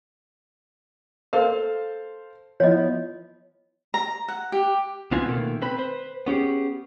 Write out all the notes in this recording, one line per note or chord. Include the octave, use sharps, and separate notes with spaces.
A4 A#4 C5 F5
F3 B3 E4 C#5 D#5
A#5
F#5
G4
C#2 B3 C4 F4 B4 G#5
B2 D#3 A3 A#3
C4 B4 B5
B4 C5
B3 C#4 G4 G#4